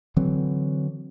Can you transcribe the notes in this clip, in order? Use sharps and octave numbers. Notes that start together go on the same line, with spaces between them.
D3 E3 F#3 C4